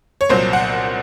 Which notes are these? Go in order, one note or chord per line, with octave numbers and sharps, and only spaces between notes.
C#5
C2 A#2 F#3 C5
F#5